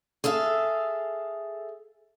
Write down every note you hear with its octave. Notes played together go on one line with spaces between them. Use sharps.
G#4 A4 E5 F5